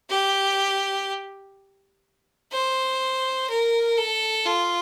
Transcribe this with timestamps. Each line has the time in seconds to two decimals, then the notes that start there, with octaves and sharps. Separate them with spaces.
0.10 G4
2.52 C5
3.49 A#4
3.98 A4
4.46 F4